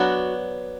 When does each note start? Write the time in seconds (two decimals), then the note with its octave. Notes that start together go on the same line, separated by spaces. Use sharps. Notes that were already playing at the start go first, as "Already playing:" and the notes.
Already playing: F#3 B3 D4 F#4